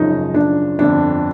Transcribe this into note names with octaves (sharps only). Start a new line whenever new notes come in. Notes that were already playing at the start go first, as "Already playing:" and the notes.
Already playing: G#1 F#2 C#3 F3 D#4
D4
G1 F2 D3 D4